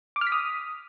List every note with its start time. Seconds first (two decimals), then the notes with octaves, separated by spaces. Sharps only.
0.16 D6
0.21 F6
0.27 B6
0.32 D#6